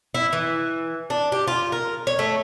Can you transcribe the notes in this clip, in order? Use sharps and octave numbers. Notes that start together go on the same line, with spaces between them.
E4
E3
D4
G4
F4
A#4
C#5
A3